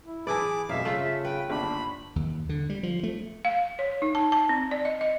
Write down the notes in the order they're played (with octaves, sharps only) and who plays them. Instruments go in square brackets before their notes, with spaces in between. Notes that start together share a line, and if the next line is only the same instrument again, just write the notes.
[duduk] E4
[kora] E3 E4 D5 [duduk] G#4 [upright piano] B4 A5 [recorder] D6
[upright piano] F#2 A3 [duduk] B2 [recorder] E5 [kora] F5
[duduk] C#3 [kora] A3 F4 [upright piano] A4 B6
[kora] B4 [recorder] G5
[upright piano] G1 D#2 [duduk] D4 [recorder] B5
[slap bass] D#2
D3
G3
F3
A3
[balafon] F5
C#5
D#4
A5
A5
C4
D5
D#5
D#5